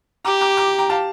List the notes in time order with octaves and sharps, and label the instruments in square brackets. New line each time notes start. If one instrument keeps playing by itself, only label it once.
[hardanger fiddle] G4 [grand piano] A#5 D6
[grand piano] A#5 D6
A#5 D6
G5 A#5
F5 A5